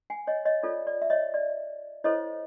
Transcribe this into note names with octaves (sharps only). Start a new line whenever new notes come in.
F#5 G#5
C#5 D#5
C#5 D#5
F4 A4 C#5 D5
D5
E5
C#5 D#5
D5
E4 A4 C5 C#5 D#5